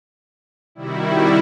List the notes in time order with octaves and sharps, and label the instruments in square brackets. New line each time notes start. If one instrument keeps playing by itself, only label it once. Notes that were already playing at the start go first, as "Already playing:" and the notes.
[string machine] C3 F#4 [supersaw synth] D#3 G3 E4